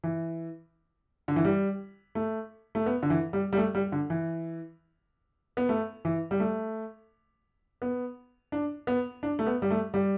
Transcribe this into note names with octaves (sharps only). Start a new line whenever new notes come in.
E3
D3
E3
G3
A3
A3
B3
D3
E3
G3
G3
A3
G3
D3
E3
B3
A3
E3
G3
A3
B3
D4
B3
D4
A3
B3
G3
A3
G3